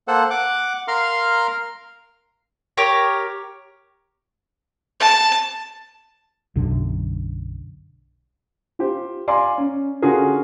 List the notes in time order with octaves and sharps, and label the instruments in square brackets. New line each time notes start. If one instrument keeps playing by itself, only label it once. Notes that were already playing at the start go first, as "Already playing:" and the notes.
[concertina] A#3 A4 C5 F#5
F#5 D6
A#4 F5 A#5 C6 F6
[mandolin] G4 A#4 C#5
[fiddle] A5
[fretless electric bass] B1 F#2 D3
[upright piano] F4 G4 C5
D5 F5 G#5 A#5 C6 D6
C#4
D3 C#4 F4 F#4 G#4 A#4